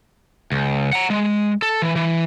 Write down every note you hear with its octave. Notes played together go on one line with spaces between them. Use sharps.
C#2
F#5 A#5
G#3
A4
E3
E3